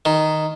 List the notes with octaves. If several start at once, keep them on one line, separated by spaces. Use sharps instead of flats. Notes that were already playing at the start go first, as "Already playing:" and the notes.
D#3